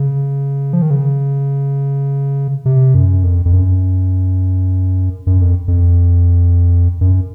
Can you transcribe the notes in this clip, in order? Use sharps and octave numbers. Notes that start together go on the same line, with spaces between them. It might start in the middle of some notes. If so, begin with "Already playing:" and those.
Already playing: C#3
F3
D#3
C#3
C3
F#2
F2
F2
F#2
F#2
F2
F2
F#2